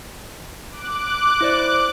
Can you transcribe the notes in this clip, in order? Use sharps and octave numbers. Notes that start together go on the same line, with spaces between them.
D6 F#6
E4 C5 D5